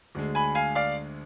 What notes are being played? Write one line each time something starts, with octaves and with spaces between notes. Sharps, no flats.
D2 D3 G#3
G#5 B5
F5 G#5
D5 F5